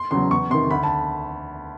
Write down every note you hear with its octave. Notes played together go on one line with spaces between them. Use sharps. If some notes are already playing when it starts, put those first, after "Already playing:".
Already playing: C6
E2 C#3 F#3 C6
E2 C#6
C3 D#3 C6
D2 B5
A5